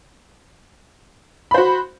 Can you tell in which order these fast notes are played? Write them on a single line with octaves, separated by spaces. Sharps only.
B5 C5 F#4